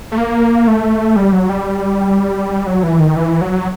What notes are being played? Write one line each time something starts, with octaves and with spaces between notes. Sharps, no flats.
A3
A#3
A3
G3
F#3
G3
F#3
E3
D#3
E3
F#3